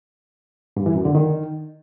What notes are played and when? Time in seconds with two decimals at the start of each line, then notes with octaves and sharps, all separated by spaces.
0.77 G2
0.86 E3
0.96 F#2
1.05 D3
1.15 D#3